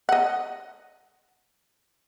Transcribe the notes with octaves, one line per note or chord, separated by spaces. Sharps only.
D#5 F#5